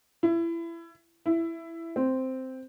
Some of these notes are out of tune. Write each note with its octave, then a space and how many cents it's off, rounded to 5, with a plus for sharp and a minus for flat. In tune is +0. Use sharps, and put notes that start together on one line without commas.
E4 +25
E4 +10
C4 -5